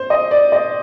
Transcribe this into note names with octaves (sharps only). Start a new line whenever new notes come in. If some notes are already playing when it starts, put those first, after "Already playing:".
Already playing: C5
D#5
D5
D#5